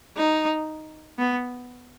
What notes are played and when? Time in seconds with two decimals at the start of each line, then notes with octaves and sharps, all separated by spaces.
0.17 D#4
1.18 B3